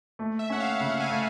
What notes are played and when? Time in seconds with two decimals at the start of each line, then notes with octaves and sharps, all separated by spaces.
0.19 A3
0.39 E5
0.50 C#4 F#5
0.60 F5
0.79 C#3 F#5
1.00 G#5
1.10 A3